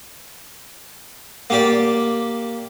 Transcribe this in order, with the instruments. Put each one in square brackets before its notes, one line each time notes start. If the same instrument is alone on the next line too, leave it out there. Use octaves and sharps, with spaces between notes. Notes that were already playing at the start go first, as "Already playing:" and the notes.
[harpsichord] A#3 G4 D5